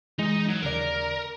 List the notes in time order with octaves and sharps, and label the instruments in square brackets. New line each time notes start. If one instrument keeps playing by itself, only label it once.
[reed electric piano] E3 G#3 [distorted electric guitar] D#4 D#5
[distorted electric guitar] F#3
[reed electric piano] D#2 C#3 D5 [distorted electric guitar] A#4